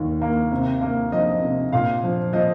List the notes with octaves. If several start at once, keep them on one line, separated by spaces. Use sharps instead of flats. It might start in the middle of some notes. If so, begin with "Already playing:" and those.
Already playing: D#2 D#3
A#3
C3
A#3
F3 D#5
C3
A#2 F5
F3
F3 D#5